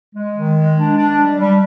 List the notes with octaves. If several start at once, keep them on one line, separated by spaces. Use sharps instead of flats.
G#3
D#3
G#3
D4
D4
G3
G3